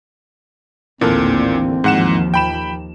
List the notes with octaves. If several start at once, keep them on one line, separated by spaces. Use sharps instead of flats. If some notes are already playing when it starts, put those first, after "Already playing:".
A1 D#2 A#2 D3 E3 A#3 C4 A4
D#2 G#2 F3 F#5 E7
G5 B5 E7